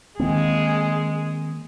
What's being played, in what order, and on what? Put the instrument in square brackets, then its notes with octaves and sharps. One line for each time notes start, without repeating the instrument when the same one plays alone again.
[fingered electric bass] D#3 A#3 C4 [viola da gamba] G#3 G#4